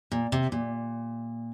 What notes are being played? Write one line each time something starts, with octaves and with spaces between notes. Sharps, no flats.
A#2
C3
A#2